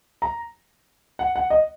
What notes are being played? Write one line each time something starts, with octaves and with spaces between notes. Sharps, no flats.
A#5
F#5
F#5
D#5